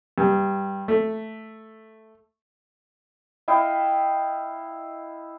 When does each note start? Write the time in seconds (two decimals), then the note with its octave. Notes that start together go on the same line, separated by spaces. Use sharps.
0.18 G2
0.88 A3
3.48 E4 D#5 F5 G5